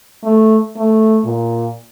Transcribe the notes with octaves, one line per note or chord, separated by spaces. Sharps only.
A3
A3
A#2